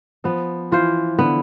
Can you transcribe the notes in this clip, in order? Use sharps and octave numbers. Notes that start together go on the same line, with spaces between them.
F3 B3
E3 F4 C5
D3 B3